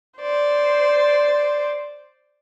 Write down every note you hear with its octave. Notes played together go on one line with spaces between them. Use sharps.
C5 D5